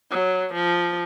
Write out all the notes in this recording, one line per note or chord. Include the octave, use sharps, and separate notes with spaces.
F#3
F3